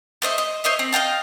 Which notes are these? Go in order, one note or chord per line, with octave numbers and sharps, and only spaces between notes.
A3 C5 D#5 E5
D#5
C5 C#5 D#5 E5
C4
D#5 F5 G5 A5